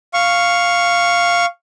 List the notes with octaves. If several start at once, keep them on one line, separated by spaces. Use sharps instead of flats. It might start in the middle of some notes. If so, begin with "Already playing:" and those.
F5 C#6